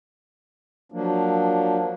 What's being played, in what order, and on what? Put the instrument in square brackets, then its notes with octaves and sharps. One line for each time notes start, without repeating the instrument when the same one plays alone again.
[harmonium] F3 F#3 A#3 D4